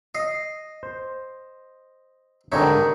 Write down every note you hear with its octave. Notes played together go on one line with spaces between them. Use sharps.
D#5 C7
C5
G#2 D3 D#3 G3 D#4 C#5 E5